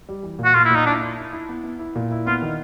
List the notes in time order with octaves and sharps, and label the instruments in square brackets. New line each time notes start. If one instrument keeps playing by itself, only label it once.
[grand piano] G3
E3
A#2
[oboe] F#4
[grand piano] A#2 [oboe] F4
[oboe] E4
[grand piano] A#2
[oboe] D#4
[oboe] D4 [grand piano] E4
[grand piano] E4
E4
E4
B3
B3
E4
A#2
E4
[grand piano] B3 [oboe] F4
[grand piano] D#3